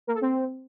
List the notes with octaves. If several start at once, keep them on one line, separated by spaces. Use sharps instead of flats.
A#3
A4
C4